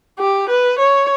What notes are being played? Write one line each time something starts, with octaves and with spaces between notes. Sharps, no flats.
G4
B4
C#5